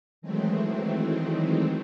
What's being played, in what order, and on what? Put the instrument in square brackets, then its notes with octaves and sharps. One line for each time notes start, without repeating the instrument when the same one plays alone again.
[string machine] D#3 E3 F#3 G#3 A3 C4